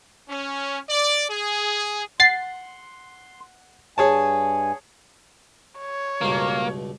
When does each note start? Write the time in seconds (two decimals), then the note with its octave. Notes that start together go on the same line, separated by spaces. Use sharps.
0.29 C#4
0.88 D5
1.29 G#4
2.20 F#5 C6 A6 C7
3.98 G2 G#4 C#5 G#5 A5
5.79 C#5
6.21 C#2 G2 B2 A#3